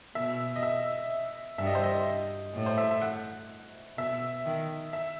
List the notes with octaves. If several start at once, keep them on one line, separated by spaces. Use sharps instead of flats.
B2 E5
D#5
E5
G2 E5
D#5
C5
D#5
A2
C5
E5
E5
F#5
B2 E5
D#3
E5